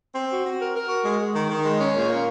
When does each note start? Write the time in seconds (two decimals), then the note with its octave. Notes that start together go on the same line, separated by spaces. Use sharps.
0.14 C4
0.29 F#4
0.45 F#4
0.60 A#4
0.74 A#4
0.89 F#4
1.04 G#3
1.19 G#3
1.34 D#3
1.49 D#3
1.64 G#3
1.78 C#4
1.95 A#2
2.09 A#3